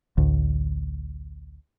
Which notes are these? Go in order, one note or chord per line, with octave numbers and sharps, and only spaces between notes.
A1 D2